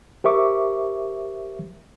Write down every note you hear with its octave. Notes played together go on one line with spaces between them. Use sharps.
G4 A#4 C5 E5 C#6 D6